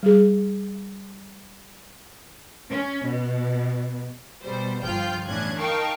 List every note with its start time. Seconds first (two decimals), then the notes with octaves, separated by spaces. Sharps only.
0.03 G3 G#4
2.70 C#4
3.07 B2
4.42 B2 G3 C5
4.81 G1 F3 F4 G5 F6 G6
5.28 E2 A2 C#4 D4 F#6 G#6
5.59 D#4 A#4 F5 G5 A5 C#6